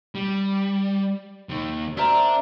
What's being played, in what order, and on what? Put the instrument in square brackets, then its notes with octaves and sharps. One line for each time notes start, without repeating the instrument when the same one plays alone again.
[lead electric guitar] G3
D#2 D#3
[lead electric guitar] D4 [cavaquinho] A#4 C5 E5